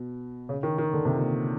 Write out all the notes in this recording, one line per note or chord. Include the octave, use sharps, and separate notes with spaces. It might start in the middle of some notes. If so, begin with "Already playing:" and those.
Already playing: B2
C#3
D#3
D#3
D3
C3
A#2